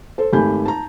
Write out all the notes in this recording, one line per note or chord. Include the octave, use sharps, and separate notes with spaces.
A4 C5
G#1 A3 G4 G#5 B5 G6
A5 A#5